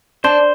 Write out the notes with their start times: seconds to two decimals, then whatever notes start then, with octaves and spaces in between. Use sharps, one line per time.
0.24 D4 C5